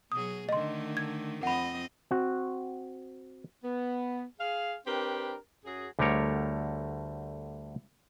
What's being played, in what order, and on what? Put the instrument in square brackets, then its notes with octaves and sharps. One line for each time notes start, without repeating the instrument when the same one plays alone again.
[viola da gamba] B2 F#3 G#4 [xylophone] D#6
[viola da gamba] D3 D#3 A3 [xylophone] D#5 C6
[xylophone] G#6
[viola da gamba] F2 C4 D#5 [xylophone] F#5 B5
[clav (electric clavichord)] C4 F#4
[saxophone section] B3
G#4 F5
C4 D4 G4 A#4 B4
F#2 F#3 G#4
[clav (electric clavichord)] D2 D3 G3 A3 A#4 C#5